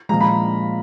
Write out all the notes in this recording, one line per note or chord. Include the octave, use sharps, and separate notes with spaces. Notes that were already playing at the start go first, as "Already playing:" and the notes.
A#2 F3 G#3 A#5
B5